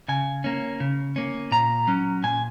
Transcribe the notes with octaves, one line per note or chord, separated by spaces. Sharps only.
C#3 G#5
A#3 C#4
C#3
A#3 C#4
A#2 A#5
F#3 C#4
A#2 G#5